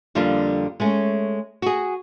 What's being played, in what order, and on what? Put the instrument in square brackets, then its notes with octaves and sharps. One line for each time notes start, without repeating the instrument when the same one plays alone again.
[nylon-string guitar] F2 D3 G3 A#3 D4 F4
G#3 A3 C#4
F#4 G#4